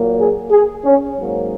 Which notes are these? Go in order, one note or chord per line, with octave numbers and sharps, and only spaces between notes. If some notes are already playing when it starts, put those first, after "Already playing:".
Already playing: A#2 F#3 A#3
G#4
G#4
C#4
G#2 F#3 A#3